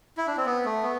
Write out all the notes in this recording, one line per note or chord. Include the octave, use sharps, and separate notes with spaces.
E4
D4
C4
B3
A3
B3